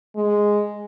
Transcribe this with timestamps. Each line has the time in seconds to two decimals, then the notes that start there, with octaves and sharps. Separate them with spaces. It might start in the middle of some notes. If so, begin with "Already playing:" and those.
0.16 G#3